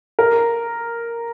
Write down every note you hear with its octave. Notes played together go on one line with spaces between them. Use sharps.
A#4